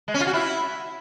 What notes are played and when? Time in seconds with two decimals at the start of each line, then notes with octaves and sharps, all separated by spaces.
0.08 G#3
0.14 C#4
0.21 F4
0.27 F#4
0.33 E4